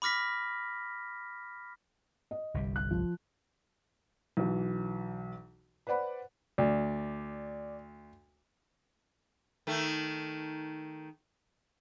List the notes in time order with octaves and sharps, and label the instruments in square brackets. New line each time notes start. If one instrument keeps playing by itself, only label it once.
[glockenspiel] B5 D6 F6 A#6 B6
[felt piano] D#5
[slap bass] G1 C2 G3
[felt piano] F#6
F3
B1 E3 F#3
B4 C5 D5 F#5 B5
[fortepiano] D2 [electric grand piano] D5
[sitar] D#3 A3